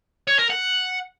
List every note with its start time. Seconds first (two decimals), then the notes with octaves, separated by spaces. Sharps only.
0.27 C#5
0.39 A#4
0.50 F#5